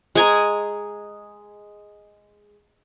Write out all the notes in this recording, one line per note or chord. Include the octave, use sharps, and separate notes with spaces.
G#3 G#5 A#5